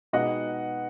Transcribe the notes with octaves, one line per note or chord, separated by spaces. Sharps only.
B2 G#3 B3 D#4 D#5 F#5